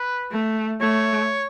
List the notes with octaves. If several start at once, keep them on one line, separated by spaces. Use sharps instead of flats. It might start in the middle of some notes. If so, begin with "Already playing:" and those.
Already playing: B4
A3
A3 C#5